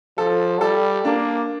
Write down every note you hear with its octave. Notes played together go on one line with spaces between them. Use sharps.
F3 A4
G3 A4
A#3 D4